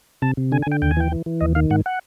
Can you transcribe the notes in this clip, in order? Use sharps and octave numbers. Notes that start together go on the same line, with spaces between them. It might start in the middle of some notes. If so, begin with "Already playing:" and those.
C3 A5
C3
D3 G#5
G#5
D3
G5
D#2 G5
G#5
E3 G5
E3
E3
D#2 D#5
D#3 F5
G#2 F#5
F#5